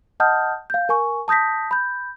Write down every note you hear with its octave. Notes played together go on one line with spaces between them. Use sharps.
D#5 F#5 A5 D#6 F6 G6
F5 G6
A#4 G#5 C#6
A5 D#6 G6 A#6 B6
B5 G6